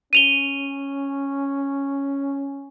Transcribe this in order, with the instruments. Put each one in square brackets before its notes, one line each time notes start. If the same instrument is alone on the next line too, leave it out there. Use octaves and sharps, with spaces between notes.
[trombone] C#4 [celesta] D#7 F7 G7